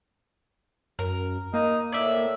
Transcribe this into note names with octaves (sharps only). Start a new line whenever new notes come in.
F#2 A#4
A#3 D#4
A2 D5 E5